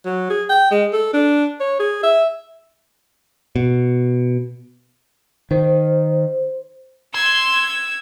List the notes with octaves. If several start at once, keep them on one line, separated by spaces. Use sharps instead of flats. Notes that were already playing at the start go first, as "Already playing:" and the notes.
F#3
G#4
G5
G#3
A4
D4
C#5
G#4
E5
B2
D#3 C5
C6 E6 G#6